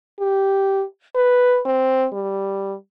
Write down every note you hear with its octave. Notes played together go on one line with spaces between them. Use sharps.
G4
B4
C4
G3